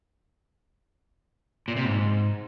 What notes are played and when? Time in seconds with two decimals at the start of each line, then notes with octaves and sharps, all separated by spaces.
1.68 A#2
1.76 C3
1.85 G#2